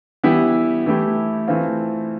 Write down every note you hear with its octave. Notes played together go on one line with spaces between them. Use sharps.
E3 G3 B3 E4 G4
E3 A3 E4 G4
E3 A3 C4 F4